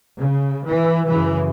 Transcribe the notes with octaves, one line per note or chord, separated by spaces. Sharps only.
C#3
E3
F#2 C#3 E3